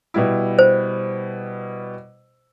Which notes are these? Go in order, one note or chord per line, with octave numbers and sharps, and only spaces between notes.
B2 G3 E4
C5